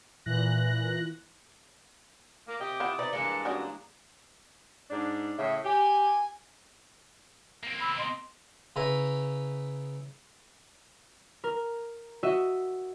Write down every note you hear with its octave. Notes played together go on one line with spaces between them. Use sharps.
A#2 E3 F#6 A#6
A#3 D6
C3 G4 D#5 D#6
E4 F4 C5 F5 F#5 D#6
C3 D#4 B4 D5
G2 E3 G#3 A#3 D4 G4 C#7
C#4 F#4 D5 D#6
G#2 D4
A2 C#3 E5
G4 G#5
A#3 C4
B5 E6
D#5 C6
C#3 E4 B4 A#5
A#4
F#4 D#5 E5